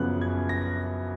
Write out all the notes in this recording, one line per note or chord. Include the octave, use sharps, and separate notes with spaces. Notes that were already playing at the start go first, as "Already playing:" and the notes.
Already playing: F#2 C#3 F3 B3 F#6
G#6
A#6